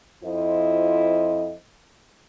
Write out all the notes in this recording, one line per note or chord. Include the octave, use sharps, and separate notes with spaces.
F2 E4 F4 C5 D#5